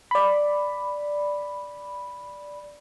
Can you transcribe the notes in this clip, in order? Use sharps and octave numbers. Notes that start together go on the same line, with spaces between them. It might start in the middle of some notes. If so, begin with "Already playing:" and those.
D5 B5